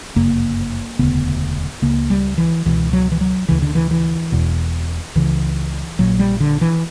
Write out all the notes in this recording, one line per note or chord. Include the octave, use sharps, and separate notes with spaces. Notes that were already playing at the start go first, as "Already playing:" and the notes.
G1 F#2 C#3 A#3
E1 D2 C#3 B3
C#2 C#3 A#3
G3
E3
C#2 B2 E3
F#3
E3
F#3
D2 C#3 E3
D3
E3
E3
E1 E2 B2
C#2 C#3 E3
A#1 A#2 F#3
G3
D3
E3